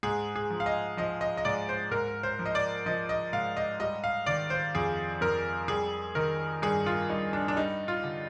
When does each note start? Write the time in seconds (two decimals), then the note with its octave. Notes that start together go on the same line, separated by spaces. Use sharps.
0.03 G#2 G#4
0.36 G#4
0.50 F3
0.60 F5
0.66 D#5
0.97 F3 D#5
1.21 D#5
1.37 D#5
1.45 G#2 D5
1.69 C5
1.91 G#2 A#4
2.23 C5
2.39 F3
2.46 D#5
2.55 D5
2.86 F3 D#5
3.09 D#5
3.33 G#2 F5
3.57 D#5
3.80 G3 D#5
4.04 F5
4.26 D#3 D5
4.50 C5
4.75 F2 G#4
5.21 F2 A#4
5.68 G3 G#4
6.15 D#3 A#4
6.62 G2 G#4
6.86 F4
7.09 G2 D#4
7.33 D4
7.48 D4
7.57 G3 D#4
7.88 F4
8.04 D3